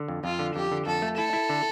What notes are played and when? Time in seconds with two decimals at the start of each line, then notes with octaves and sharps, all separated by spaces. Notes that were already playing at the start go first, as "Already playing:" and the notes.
Already playing: D3
0.08 F2
0.24 F2 F4
0.39 D3
0.55 F2 G4
0.72 D3
0.86 F2 A4
1.02 A3
1.18 E4 A4
1.33 E4
1.50 D3